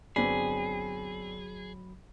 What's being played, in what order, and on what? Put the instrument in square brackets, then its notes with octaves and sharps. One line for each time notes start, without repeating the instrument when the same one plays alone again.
[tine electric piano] G1 F#3 B5 [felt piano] B3 C4 D4 [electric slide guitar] G#4